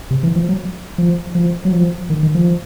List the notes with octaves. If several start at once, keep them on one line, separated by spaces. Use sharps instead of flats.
C3
E3
F3
F#3
F3
F3
F#3
F3
D#3
D#3
F3